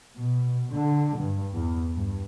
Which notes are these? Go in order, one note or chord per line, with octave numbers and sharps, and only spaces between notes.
B2
D3
G2
E2
G2